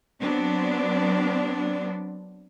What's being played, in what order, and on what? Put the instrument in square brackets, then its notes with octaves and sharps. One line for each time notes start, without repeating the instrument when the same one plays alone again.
[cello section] F#3 B3 C4 D4